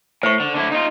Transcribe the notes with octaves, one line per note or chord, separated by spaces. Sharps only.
A2 C5 C#6
D3
D3 E4
D#4 F4